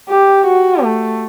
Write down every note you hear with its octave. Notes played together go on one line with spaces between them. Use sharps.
G4
F#4
A3